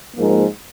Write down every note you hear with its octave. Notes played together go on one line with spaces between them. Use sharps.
G#2 F3 A#3